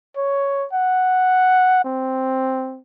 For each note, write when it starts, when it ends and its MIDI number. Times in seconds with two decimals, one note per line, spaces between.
0.16 0.65 73
0.73 1.81 78
1.85 2.79 60